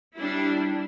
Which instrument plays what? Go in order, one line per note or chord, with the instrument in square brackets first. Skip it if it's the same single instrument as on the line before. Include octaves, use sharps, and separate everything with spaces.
[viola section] G3 D4 E4